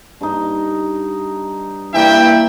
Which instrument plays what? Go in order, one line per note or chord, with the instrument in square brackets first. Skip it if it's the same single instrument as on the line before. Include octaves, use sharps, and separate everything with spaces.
[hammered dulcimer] G2 D#4
[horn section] G2 E5 G5 [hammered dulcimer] E3 A#3 [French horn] E4